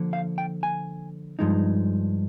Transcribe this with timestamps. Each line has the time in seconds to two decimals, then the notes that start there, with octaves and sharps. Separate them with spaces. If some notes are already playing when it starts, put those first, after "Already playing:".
Already playing: D3 F3 A#3
0.13 F5
0.38 G5
0.63 G#5
1.39 G2 F3 G#3 D#4